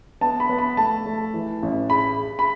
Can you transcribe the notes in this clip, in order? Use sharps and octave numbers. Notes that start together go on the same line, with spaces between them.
B3 A5
B5
B3
B5
A3 A5
A3
E3
A1
G#4 B5
G#4
B5